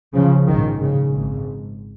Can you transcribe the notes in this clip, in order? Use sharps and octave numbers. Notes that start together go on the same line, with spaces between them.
C#3 F3
A#1 G#2 D#3
C#3
G#1 G#2